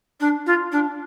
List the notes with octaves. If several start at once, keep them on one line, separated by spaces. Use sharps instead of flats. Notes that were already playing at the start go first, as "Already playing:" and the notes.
D4
F4
D4